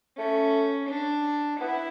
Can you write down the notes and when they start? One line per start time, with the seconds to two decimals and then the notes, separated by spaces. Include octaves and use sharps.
0.18 A3 C#4
0.89 D4
1.60 B3 E4